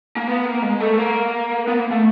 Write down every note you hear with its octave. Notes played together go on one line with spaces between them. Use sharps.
A#3
B3
A#3
G#3
A3
A#3
B3
A#3
A3